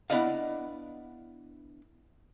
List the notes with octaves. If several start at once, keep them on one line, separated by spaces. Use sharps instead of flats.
B3 D4 E4 D5 D#5 F5